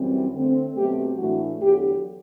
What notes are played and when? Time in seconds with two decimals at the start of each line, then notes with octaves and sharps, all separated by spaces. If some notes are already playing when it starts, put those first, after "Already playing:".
Already playing: F#2 E3 G3 C4
0.33 D3 A3 C4
0.76 B2 F#3 A3 C4 G4
1.18 A2 E3 A3 D4 F#4
1.60 E2 D3 F#3 G4